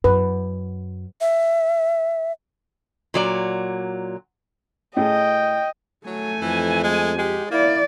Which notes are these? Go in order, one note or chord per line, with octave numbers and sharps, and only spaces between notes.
F#2 B4
E5
A#2 F#3 D5
A2 G#4 D#5 G5
F#3 A3 G#5
F2 E3
G#3
G#3 G4
A#3 E4 D5